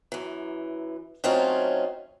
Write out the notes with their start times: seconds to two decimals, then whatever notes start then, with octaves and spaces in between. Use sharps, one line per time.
0.12 F#2 E3
1.24 F#3 A3 C4 C#4 D#4 F4